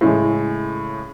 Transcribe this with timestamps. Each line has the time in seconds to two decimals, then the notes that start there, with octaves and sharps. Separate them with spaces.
0.01 A2 C#3 E3 G#3